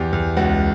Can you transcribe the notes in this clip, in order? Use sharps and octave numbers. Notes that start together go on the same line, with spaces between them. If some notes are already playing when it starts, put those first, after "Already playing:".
Already playing: E2 G4
E2
C#2 F#4